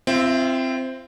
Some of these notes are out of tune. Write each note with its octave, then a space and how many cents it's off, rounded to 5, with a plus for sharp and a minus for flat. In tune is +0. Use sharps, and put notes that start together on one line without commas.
C4 +0 F4 -35 E5 -5